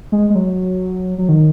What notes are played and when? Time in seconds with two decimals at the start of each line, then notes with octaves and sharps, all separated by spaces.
0.12 G#3
0.30 G#3
0.35 F#3
1.18 F#3
1.29 D#3